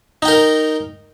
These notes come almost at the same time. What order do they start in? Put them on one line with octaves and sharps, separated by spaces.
D#4 G5 A#4